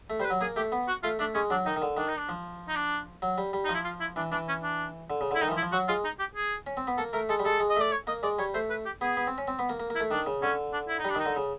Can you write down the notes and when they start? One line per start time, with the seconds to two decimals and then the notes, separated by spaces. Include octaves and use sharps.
0.10 A3
0.20 G3 C5
0.25 B4
0.30 F#3
0.41 A#3 G#4
0.56 A3 G4
0.72 B3
0.88 F#4
1.03 A3 F4
1.19 A3 D4
1.34 G#3 C#4
1.50 F#3 D4
1.66 D#3 D#4
1.76 D#3
1.82 D3
1.97 D#3 D4
2.08 D#4
2.18 D4
2.29 F3
2.68 D#4
2.75 D4
3.22 F#3
3.38 G3
3.53 G3
3.65 D#4
3.69 F3
3.74 E4
3.84 F4
4.00 E4
4.16 E3 D4
4.31 E3 D4
4.48 C#4
4.63 D4
5.10 D3
5.21 C#3
5.31 D3 E4
5.42 D#3 D#4
5.48 E3
5.52 F3
5.57 E4
5.63 F3
5.72 F#3 F#4
5.88 G#3 F4
6.04 D#4
6.19 G4
6.35 G#4
6.67 C#4
6.77 C4
6.87 B3
6.97 A#3 A4
7.13 A3 A#4
7.29 G#3 A4
7.39 G3
7.45 G#3 A4
7.60 G#3
7.69 D#5
7.76 A3 D5
7.92 C#5
8.07 A#3 D#5
8.23 G#3 D5
8.39 G3 C#5
8.54 A3 C5
8.70 B4
8.85 G4
9.01 B3 G#4
9.17 B3
9.27 C4
9.38 C#4
9.48 C4
9.59 B3
9.69 A#3
9.80 A#3
9.90 A#3
9.95 E4
10.00 A3
10.11 D#3 D4
10.26 C#3
10.42 D3 C#4
10.73 D4
10.88 E4
10.99 D#4
11.04 G3
11.10 D4
11.15 D#3 D#4
11.26 D3
11.36 C#3